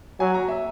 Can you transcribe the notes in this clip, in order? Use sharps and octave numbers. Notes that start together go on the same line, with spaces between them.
F#3 G#5
A#5
E5